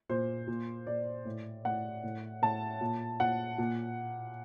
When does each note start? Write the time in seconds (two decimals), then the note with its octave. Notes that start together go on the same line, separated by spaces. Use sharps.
0.09 A#2 C5
0.48 A#2
0.87 A#2 D5
1.25 A2
1.65 A2 F#5
2.03 A2
2.42 A2 A5
2.81 A#2
3.20 A#2 F#5
3.58 A#2